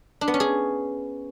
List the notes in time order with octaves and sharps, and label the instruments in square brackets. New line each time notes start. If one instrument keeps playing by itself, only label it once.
[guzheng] D4
B3
C#4
G#4